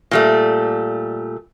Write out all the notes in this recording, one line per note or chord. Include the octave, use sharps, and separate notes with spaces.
A#2 G3 A3